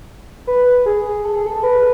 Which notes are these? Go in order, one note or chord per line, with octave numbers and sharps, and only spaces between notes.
B4
G#4
A4
G#4
A4
B4